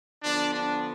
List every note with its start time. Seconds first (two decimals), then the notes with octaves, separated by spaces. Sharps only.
0.24 D3 F3 B3 D4
0.54 D4